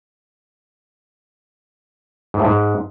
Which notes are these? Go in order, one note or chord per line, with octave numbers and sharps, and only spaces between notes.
G#2
A2
G#2